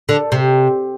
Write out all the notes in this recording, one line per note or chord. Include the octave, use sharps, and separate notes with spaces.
D3
C3